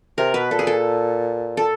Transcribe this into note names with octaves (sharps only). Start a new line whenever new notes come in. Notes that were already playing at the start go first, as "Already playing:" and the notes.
C3 A#4
B2 B4
A#2 A4
G#4
A4
A4